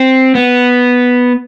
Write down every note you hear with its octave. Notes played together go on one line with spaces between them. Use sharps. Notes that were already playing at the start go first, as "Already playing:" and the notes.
Already playing: C4
B3